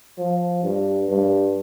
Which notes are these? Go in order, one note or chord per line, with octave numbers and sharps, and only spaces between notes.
F3
G2
G2